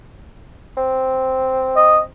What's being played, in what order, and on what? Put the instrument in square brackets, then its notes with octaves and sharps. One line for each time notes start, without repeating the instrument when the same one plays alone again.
[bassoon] C4
[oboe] D#5